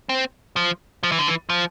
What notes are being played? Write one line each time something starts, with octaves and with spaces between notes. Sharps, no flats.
C4
F3
F3
E3
D3
E3
F3